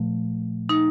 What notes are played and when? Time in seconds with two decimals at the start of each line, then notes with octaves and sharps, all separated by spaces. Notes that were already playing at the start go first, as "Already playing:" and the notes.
Already playing: A#2 F3 A3
0.69 D#4